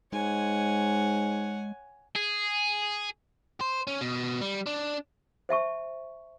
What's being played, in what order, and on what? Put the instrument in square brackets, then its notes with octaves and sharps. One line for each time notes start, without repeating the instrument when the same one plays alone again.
[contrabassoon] G#2 [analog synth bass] G#3 [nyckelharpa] C#5 F#5 [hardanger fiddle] G#5
[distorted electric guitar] G#4
[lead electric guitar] C5
C#4
B2
G3
D4
[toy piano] C5 E5 A5 C#6